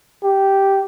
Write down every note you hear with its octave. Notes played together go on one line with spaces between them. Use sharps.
G4